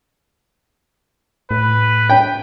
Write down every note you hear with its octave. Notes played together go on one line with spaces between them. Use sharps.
A2 B4
G5